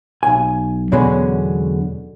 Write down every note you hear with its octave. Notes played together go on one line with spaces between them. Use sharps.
B1 G#5
E2 B2 D3 F#3 G#3 C#4